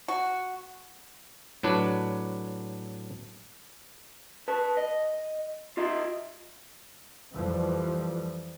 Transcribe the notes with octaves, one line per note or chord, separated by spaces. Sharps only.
F#4
A2 F#3 D4 B4
B4 A5
D#5
F4 D#5 E5
F2 E3 F3 G3